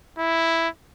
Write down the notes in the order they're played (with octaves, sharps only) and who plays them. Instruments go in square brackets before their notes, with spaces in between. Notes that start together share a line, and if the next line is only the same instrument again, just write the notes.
[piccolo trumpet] E4